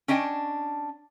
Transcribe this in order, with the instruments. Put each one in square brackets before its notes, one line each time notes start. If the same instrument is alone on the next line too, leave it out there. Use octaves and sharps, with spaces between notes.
[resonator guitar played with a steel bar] C#4 D4 D#5 G5 A5